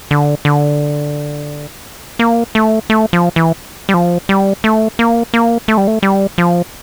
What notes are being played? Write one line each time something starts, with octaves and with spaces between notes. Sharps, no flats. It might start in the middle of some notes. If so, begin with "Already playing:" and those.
D3
D3
A#3
A3
A3
F3
E3
G3
F3
G3
A3
A#3
A#3
A3
G3
A3
G3
F3